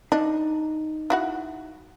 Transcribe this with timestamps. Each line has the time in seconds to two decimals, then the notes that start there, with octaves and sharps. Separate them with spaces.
0.12 D4 D#4
1.10 E4 F#4 F#5